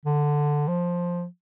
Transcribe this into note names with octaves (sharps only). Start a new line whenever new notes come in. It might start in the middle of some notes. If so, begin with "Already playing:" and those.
D3
F3